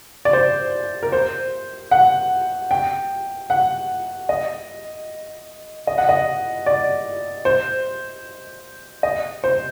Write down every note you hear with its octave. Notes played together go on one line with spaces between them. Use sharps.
D5
C5
A#4
C5
F#5
G5
F#5
D#5
D#5
F#5
D#5
D5
C5
D#5
C5